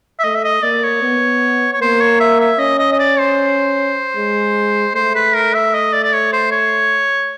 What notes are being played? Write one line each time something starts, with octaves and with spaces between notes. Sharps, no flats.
E5
A3 D#5
E5
D#5
A#3 D5
C#5
B3
C#5
A#3 C5
C#5
E5
E5
C#4 D#5
D#5
D#5
D5
C5
G#3
A3 C5
B4
A#4
E5
D#5
D5
D5
C#5
C5
C#5